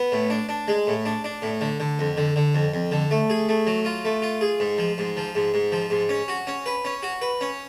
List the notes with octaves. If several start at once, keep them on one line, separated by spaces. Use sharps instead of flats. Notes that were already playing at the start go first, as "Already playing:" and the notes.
Already playing: B3
A2
D4
D4
G#3
A2
D4
D4
A2
D3
D3
F2
D3
D3
F2
F2
D3
A3
G#4
A3
F#3
F4
A3
F4
G#4
G#2
F3
G#2
F3
G#2
G#2
F3
G#2
C#4
F#4
C#4
B4
C#4
F#4
B4
C#4